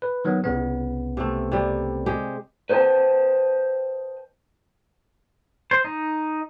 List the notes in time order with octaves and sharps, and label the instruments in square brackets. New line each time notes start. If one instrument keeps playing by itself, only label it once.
[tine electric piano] B4
D#3 F#3 B3
C2 C#3 B3
[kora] C3 A3
C3 G3
G#3 G4
[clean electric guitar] B4 C5 D#5 F#5 G5 A5
[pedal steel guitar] C5
D#4